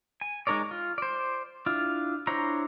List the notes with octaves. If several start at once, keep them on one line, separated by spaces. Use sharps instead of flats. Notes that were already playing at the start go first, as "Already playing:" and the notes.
G#5
G#3 D#4 A#4 C#5 D5
F4
C5 D5
D4 E4 F4
D4 E4 C5 C#5 A#5